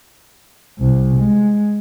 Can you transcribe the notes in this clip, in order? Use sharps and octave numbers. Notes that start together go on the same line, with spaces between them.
C2
G#3